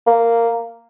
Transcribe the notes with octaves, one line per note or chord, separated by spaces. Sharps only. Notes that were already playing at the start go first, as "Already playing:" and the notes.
A#3